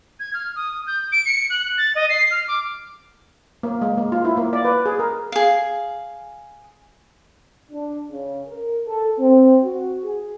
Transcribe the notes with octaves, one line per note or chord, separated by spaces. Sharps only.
G#6
F6
D#6
G6
D7
C#7
F#6
A6
D#5
C7
F6
D6
A#3
G#3
A#3
F4
E4
A#3
D5
B4
G#4
A#4
G#4 F5
D4
C#3
A#4
A4
C4
F#4
G#4